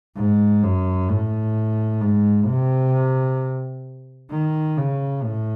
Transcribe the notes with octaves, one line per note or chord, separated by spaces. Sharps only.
G#2
F#2
A2
G#2
C3
D#3
C#3
A2